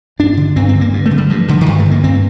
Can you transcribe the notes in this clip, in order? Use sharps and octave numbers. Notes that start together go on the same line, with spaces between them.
G2 D4
D3
G2 C4
C4
D3
A#3
G2
A3
D3
G3
G2 F3
D3 F3
D3
G2 D#3
A3
D3
A#3
G2 C4